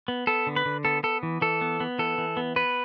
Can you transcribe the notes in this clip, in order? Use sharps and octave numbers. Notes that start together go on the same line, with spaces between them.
B3
B3 A4
D3
B4
D3
B3 A4
B3 A4
E3
E3 A4
B3
B3
E3 A4
E3
B3
B3 B4